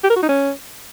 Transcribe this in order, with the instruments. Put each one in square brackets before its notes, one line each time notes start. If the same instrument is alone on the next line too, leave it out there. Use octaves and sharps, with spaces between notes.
[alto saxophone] G4
A#4
F#4
D#4
C#4